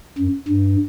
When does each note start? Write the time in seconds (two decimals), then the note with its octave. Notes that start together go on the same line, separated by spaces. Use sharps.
0.18 F#2
0.48 G2